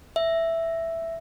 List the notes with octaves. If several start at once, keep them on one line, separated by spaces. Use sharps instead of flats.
E5